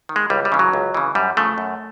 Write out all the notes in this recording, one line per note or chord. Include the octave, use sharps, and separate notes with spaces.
D#3
G#3
C#2 G3
G3
C#3 E3
F#3
C#2
C#3 E3
F#2 G3
C#3 F3 A3
F#2